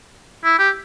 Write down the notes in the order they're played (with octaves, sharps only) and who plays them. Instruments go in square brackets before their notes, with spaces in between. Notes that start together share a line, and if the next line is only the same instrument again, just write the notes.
[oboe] E4
G4